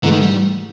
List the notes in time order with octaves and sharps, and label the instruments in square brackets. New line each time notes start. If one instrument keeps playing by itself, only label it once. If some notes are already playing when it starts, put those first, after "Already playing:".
[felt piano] G#2 E3 A3 [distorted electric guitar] D3
[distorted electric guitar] D#3
G3